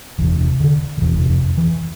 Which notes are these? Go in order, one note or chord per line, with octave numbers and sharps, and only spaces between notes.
E1 E2 C3 E3
D3
D3
E1 E2 C3 E3
F2 F3
E3